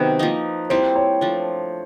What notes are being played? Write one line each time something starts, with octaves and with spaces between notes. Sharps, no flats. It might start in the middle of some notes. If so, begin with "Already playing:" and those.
Already playing: C3 D#3 F#3 B3 B4
F3 A#3 D#4
G3 C4 E4 C5
C#5
F3 A3 D4